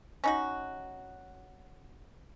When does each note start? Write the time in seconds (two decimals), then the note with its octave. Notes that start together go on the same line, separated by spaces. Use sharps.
0.24 C#4 D#4 F#4